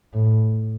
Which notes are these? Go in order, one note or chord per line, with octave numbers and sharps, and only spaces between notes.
A2